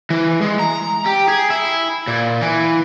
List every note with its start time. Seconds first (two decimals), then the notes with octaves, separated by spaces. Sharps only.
0.10 E3
0.42 G#3
0.59 A#5
1.06 G4
1.28 G#4
1.50 E4
2.07 A#2
2.41 E3